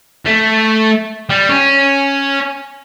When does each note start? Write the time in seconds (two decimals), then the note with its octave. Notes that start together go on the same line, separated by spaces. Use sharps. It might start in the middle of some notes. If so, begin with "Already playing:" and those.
0.26 A3
1.30 G3
1.49 C#4